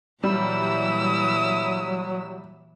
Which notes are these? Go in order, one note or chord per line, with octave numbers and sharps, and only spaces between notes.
A#2 E3 F#3 G3 E4 E6